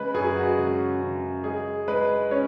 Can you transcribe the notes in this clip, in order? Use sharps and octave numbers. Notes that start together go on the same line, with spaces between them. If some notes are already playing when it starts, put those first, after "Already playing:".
Already playing: C#3 G#3 B4
F#2 G#4
F#4
C#3
C#3
G#3 G#4
G#3 B4
C#4 C#5